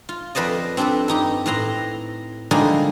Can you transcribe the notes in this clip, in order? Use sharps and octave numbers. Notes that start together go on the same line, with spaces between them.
F4
F2 B4 C5 D5 D#5
C4 D4 G4 A4 B4
G2 D#4 G4
A2 C4 B4 A#5 C6
D3 F3 G3 G#3 A#3 D#4